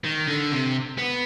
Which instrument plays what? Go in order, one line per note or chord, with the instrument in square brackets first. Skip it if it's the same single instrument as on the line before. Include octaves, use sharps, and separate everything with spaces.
[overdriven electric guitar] D#3
D3
C3
B3